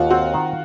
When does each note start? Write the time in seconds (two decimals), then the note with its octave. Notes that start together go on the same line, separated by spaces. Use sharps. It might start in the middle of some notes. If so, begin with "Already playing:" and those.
Already playing: D#2 F4 F#4
0.10 C4 F#4
0.34 D#3